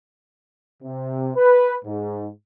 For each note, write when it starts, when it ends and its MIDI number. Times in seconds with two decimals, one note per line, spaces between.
0.83 1.31 48
1.36 1.77 71
1.85 2.29 44